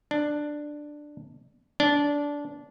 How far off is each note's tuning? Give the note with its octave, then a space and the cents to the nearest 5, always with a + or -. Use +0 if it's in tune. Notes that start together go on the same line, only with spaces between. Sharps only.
D4 +10
D4 -15